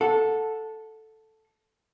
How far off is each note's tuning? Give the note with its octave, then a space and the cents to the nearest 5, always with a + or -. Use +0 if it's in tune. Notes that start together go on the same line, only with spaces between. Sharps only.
A4 +0 F#5 -25